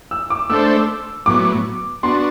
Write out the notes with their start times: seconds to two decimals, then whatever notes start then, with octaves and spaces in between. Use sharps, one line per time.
0.11 E6
0.30 D6
0.50 A3 D4 A4 C5 E6
1.26 A2 F#3 B3 D6
2.03 B3 D4 F#4 C6